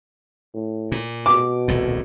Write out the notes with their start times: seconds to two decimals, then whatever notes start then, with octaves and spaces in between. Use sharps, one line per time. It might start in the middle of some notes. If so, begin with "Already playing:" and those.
0.54 A2
0.92 A#2
1.26 B2 D6
1.68 D#1 C2 A2